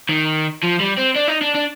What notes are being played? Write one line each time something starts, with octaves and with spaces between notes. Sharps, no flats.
D#3
F3
G3
C4
D4
D#4
D4
D4